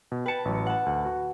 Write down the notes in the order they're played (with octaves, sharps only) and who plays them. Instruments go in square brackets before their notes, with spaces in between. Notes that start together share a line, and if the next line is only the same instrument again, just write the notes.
[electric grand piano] B2
[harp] B4 A5 [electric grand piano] G5 C#7
[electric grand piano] A1 F#3
[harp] F#5 A5
[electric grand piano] D2
F#4